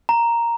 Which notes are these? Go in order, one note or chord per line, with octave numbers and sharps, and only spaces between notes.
A#5